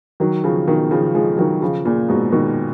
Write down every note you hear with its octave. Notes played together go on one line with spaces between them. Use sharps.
D#3 F#3
C#3 F3
B2 D#3
C#3 F3
F3 G#3
D#3 F#3
C#3 F3
A#2 C#3
G#2 B2
B2 D#3